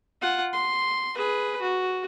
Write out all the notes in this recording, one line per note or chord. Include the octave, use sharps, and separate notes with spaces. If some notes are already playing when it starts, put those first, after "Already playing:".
F4 F#5
C6
G#4 B4
F#4